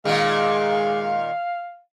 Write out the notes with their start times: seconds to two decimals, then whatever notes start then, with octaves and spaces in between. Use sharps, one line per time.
0.05 A#2 D#3 G#3 F5